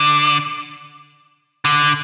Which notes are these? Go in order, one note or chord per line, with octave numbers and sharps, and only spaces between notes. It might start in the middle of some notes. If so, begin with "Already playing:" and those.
Already playing: D3
D3